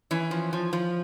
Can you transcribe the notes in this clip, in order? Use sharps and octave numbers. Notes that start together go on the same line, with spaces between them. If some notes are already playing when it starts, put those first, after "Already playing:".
E3 C#4
F3
F3
F3